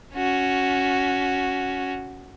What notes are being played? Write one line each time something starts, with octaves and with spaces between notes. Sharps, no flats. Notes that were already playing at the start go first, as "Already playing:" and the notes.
C#4 F#4